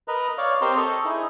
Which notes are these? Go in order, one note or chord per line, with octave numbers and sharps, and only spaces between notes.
A#4 B4 D#5
C#5 D5 F5
C4 G4 A#4 C5 D#5 C6
A4 D#5 C#6
D#4 E4 G#4